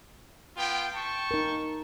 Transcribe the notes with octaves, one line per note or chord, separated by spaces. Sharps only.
B3 F4 G5
G5 A5 C#6
D#4 A#4